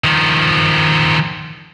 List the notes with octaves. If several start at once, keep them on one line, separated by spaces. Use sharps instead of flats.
D#3 F3